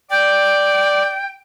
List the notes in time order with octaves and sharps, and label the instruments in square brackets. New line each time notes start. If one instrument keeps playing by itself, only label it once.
[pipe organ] D5 [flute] G5